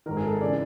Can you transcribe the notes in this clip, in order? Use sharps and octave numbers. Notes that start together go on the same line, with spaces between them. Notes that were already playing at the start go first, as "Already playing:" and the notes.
G#1 G#2 D#3 A#4
G#4
A4
C#3 E3 D5